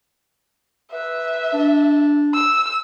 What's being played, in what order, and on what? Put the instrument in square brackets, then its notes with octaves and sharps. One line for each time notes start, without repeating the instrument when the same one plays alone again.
[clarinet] B4 [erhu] E5
[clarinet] D4
[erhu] E6